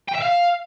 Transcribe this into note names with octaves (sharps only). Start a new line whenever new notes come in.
G5
E5
F5